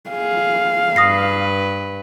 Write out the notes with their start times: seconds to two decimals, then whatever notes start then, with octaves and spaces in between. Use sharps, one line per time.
0.10 G#4 F5
0.96 G2 B4 D#6 A#6 C7